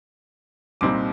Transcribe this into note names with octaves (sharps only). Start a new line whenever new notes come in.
C2 A#2 G3 C4 D#4 D6